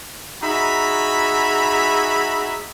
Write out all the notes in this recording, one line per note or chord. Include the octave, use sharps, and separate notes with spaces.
D#4 F#4 G#4 E5 A#5 B5